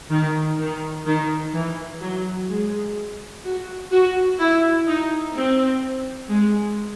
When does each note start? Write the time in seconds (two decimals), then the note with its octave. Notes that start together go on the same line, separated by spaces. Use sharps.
0.11 D#3
0.59 D#3
1.06 D#3
1.54 E3
2.01 F#3
2.49 G#3
3.44 F#4
3.92 F#4
4.39 E4
4.87 D#4
5.35 C4
6.29 G#3